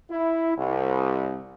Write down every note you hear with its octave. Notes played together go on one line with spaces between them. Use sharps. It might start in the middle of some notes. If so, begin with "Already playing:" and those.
E4
C2